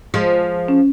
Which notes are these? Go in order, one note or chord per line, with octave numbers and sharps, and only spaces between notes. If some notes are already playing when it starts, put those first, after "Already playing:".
F3 G#3
C#4